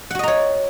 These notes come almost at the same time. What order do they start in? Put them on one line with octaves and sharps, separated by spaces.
F#5 F#4 D#5 A#5 C#5